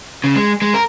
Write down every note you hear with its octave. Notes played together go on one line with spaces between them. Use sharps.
C#3
G#3
G#3
A#4